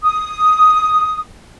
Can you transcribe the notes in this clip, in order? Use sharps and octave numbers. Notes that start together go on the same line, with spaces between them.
D#6